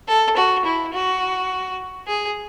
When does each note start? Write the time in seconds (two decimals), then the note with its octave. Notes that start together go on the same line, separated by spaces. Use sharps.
0.08 A4
0.37 F#4
0.65 E4
0.93 F#4
2.07 G#4